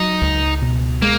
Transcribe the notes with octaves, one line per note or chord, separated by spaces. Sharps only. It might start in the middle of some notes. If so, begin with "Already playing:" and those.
Already playing: F#3 D#4
C#2
B2
G#3 A#3